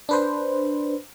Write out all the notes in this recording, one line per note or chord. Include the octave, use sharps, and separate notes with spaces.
D4 B4 C5